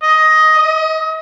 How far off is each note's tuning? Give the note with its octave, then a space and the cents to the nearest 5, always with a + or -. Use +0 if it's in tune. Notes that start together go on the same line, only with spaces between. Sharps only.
D#5 +10
D#5 +35